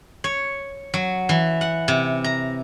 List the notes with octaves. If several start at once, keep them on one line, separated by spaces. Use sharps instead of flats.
C#5
F#3
E3
F#5
C3
A#5